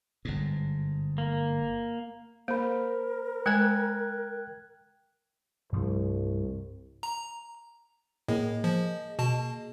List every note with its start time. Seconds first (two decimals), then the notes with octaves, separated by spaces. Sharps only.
0.25 G1 G#2
1.18 A#3
2.48 A#3 A#4 C5 B5
3.46 G#3 G5 G#5 F#6 G#6
5.72 C2 G2 F3 A3
7.03 A#5
8.28 A2 A#3 G#4 D#5
8.64 F3
9.19 B2 A5